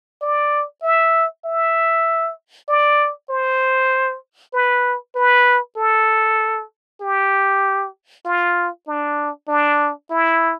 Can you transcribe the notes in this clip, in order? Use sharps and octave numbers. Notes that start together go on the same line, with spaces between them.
D5
E5
E5
D5
C5
B4
B4
A4
G4
F4
D4
D4
E4